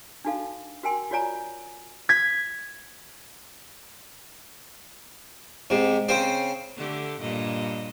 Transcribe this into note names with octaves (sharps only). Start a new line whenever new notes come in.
D4 D#4 F#4 A4 F5
F#4 A#4 G5 G#5 C6
F4 F#4 C#5 D5 G#5 A#5
G#6 B6
G#2 C3
C#3 C4 C5
D3 A3 G4
G2 A#2 D#5